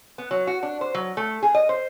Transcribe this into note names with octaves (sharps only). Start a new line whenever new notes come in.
B3
F#3
F#4
D4
C5
F#3
A3
G#4
D#5
C5